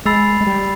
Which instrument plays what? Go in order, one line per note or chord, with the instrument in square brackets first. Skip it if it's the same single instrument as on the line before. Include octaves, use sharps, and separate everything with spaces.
[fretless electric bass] G#3 [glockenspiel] B5 E6 A6 C7 F7
[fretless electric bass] G#3
G3